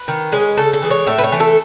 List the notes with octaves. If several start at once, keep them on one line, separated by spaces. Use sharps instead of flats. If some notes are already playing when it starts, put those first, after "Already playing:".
Already playing: B4
D#3
G#3 C#4
C#3 A4
A4
E3 G#3
C#5
A2 E5
B4
C#5
E3 A3
A4